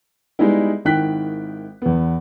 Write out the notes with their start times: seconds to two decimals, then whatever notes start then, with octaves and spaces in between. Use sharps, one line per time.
0.39 G3 G#3 B3 D#4 E4
0.85 G#1 D#3 E4 G5 F#6 B6
1.82 E2 B3